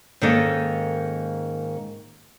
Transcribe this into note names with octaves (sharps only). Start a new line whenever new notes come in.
G#2 D#3 A#3 C#4 A4 D#5